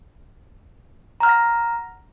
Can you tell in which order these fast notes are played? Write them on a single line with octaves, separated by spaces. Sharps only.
A#5 F6 F#5 A#6